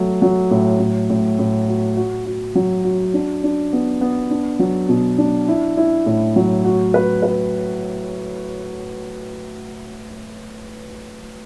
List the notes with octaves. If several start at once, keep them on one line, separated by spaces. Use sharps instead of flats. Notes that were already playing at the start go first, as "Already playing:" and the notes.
Already playing: F#3 A3
F#3
A2
A2
A2
A2
F#4
F#4
F#4
F#3
F#4
D4
D4
B3
B3
D4
F#3
B2
D4
E4
E4
A2
F#3
F#4
B4
B4